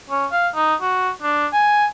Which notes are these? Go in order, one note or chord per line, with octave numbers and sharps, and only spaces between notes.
C#4
F5
D#4
F#4
D4
G#5